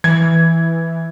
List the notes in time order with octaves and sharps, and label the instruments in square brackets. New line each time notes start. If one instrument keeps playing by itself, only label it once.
[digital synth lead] E3 [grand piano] G#6